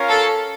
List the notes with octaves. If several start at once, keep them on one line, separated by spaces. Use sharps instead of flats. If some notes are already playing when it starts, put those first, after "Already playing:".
Already playing: C#4 F4 A#4 C#5 F5
A4